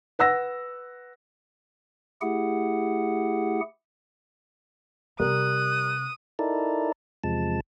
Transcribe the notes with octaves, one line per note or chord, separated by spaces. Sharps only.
B4 F#5 E6 A#6
A3 E4 G4 G#4 F#5
C3 G3 A#4 D#6 F#6
D#4 E4 A4 A#4 D5
E2 C3 F3 G#3 A5